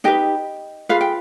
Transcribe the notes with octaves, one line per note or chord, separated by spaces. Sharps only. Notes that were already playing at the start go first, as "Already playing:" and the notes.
D#4 G4 B4 D#5 G5
F4 G#4 B4 F5
G5